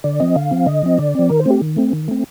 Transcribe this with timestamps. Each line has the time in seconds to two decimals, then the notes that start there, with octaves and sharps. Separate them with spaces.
0.04 D3 D5
0.20 F3 C4 D#5
0.36 D3 F5
0.51 F3 C4
0.66 D3 D#5
0.83 F3 C4
0.98 D3 D5
1.15 F3 C4
1.29 D#3 A#4
1.40 C5
1.46 A3 C4 G4
1.62 D#3
1.76 A3 C4
1.93 D#3
2.08 A3 C4